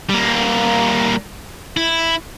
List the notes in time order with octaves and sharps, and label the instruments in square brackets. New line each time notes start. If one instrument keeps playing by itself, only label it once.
[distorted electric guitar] G3 A#3
E4